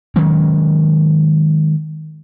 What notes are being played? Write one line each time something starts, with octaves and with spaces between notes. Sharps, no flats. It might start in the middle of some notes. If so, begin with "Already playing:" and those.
D#3 F#3 G#3 C#4